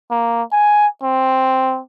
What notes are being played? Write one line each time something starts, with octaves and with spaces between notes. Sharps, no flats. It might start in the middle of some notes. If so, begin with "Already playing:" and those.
A#3
G#5
C4